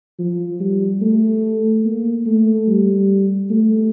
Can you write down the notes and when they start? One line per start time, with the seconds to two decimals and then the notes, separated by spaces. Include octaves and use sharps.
0.19 F3
0.60 G3
1.01 A3
1.85 A#3
2.26 A3
2.67 G3
3.50 A3